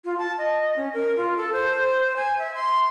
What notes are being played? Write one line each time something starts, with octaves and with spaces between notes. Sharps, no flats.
F4
A5
D#5
C#4
A#4
F4
A4
C5
G#5
E5
C6